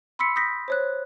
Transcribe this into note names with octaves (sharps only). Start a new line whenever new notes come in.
B5 C6 E6 B6 C#7
D#6 G6 A#6 B6
C5 C#5 F#6